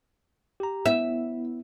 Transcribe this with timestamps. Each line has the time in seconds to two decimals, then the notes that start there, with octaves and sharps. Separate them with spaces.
0.60 G4 A#5
0.86 B3 E4 E5